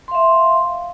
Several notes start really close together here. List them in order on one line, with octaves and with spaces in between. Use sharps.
C6 F5 E5